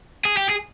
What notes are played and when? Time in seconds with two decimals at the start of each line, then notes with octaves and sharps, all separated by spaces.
0.25 G#4
0.37 G4
0.49 G#4